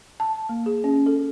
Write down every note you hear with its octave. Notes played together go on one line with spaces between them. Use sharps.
A5
A#3
G#4
C#4
A4